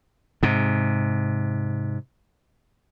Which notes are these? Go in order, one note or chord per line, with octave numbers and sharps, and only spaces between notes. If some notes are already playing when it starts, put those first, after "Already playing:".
G#2 C3